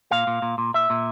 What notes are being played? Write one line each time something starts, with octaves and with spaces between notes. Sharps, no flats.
A#2 F5
A#2
A#2
A#2
A#2 E5
A#2